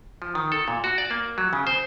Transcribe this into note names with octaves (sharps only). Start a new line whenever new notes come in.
F3
D#3
A4
A#2
F#4
D5
A#3
F#3
C#3
C5